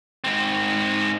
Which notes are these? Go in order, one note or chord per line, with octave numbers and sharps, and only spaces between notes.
G#2 C4